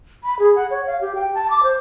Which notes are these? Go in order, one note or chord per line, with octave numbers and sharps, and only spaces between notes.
B5
G#4
F#5
C#5
F5
G4
G5
A5
D6
C5